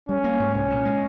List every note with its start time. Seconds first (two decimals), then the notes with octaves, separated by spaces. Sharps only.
0.09 G3 C#4
0.24 A#3
0.40 G#2
0.54 C2 C#4
0.70 A#2
0.85 G#3